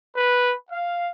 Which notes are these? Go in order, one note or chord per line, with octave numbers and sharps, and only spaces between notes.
B4
F5